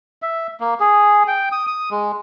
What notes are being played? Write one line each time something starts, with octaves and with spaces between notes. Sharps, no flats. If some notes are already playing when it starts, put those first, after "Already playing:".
E5
A#3
G#4
G5
D#6
D#6
G#3